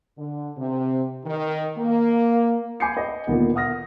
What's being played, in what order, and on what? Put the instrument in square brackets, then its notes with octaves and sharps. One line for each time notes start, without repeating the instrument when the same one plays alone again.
[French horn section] D3
C3
D#3
A#3
[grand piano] G#5 B5 D6 G6 C7 C#7
D#5
A#2 D3 D#3 B3
F#5 D#6 F6 A#6